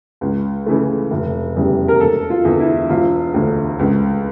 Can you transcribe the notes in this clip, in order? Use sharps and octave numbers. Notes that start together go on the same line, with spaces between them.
C#2
C#3 E3 A3
F1
E2 C#3 G3
A#4
E1 A4
F4
E2 D3
E4
E1 F4
D2 D3
C#2